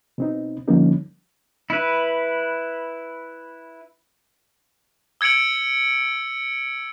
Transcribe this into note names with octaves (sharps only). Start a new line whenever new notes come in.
B2 C4 D#4
D3 F3 G3 A#3 C#4 D#4
E4 B4
E6 G#6 C#7 D7 F#7